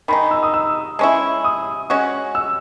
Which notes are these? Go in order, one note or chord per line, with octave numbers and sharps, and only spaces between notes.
D#3 G#3 D#4 B5
E6
D#6
E6
G#3 C#4 E4
D#6
G#3 C#4 F#4
E6